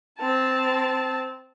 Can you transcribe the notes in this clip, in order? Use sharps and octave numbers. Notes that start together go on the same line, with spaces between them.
C4 A5